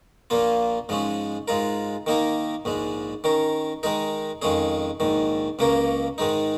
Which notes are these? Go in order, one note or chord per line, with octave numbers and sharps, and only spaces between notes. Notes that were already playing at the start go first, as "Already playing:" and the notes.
A#1 A#2 A#3 F4
G#2 F3 G#3 C#4
G#2 G#3 F4 A#4
D#3 A#3 D#4 A#4
A#1 G#2 G#3
D#3 C#4 A#4
D#3 G#3 D#4 A#4
F2 D#3 G#3 C#4 G#4
A#1 G#2 D#3
C#2 C#3 A#3 C#4 A#4
G#2 D#3 G#3 D#4